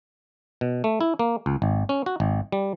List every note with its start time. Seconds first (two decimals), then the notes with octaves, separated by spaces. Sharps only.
0.61 B2
0.84 A3
1.01 E4
1.19 A#3
1.46 C#2
1.62 G#1
1.89 C#4
2.06 F#4
2.20 G#1
2.52 G3